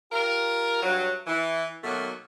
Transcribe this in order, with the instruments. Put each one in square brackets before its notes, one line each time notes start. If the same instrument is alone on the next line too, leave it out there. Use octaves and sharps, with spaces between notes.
[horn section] F4 G4 A#4
G2 F#3
E3
B2 D#3 F#3 A3 A#3